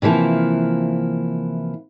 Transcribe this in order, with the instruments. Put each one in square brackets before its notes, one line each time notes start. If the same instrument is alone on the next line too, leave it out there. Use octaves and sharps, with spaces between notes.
[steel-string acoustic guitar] C3 E3 F3 A#3 E4